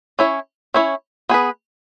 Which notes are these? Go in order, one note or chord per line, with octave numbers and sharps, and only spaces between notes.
C#4 E4 C#5
C#4 E4 C#5
B3 G#4 B4